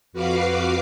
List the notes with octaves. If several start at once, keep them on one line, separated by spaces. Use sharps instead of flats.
F2 F#4 B4 F5 D6 C7